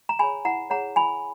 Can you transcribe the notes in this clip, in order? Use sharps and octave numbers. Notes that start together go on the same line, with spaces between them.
A#5
G#4 C#5 G#5 B5
E4 F#5 A#5
G#4 C#5 F#5 A#5
E4 G#5 B5